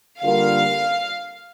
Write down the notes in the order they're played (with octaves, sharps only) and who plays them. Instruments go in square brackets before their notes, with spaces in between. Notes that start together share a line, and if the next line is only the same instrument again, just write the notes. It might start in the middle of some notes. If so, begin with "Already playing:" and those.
[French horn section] D3 G3 A#3 F4 A#4 [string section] F5